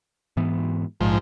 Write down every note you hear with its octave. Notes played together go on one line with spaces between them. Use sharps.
G#2 E3 B3
A#1 G#2 F3